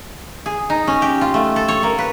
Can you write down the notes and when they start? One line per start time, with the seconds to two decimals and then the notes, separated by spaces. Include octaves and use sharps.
0.46 G#4
0.70 D#4
0.87 C#4
1.02 G4
1.21 F4
1.34 A3
1.56 A4
1.68 C#5
1.83 A#3
1.99 B4